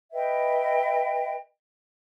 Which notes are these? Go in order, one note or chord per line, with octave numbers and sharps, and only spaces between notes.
B4 D#5 E5 G5